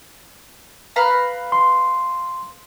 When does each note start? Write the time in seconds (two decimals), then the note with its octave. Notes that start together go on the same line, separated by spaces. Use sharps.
0.96 B4 F5 A#5
1.52 C6